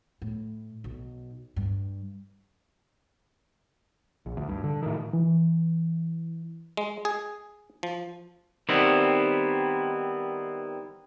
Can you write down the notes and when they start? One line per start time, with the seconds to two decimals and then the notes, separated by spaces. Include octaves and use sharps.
0.22 A2
0.84 B1
1.56 G2
4.26 A#1
4.37 D2
4.49 G2
4.64 D3
4.83 A2 D#3
5.13 E3
6.77 G#3
7.05 G#4
7.83 F3
8.69 D#3 G3 B3 C4 E4